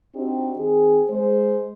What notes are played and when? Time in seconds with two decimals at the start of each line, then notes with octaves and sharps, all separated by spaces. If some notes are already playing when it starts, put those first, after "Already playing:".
0.15 C4 D4 D#4 F#4 G4
0.57 D#3 C4 G#4
1.10 G#3 C5